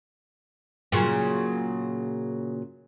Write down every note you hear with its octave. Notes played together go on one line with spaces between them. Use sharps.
A#2 C#3 F#3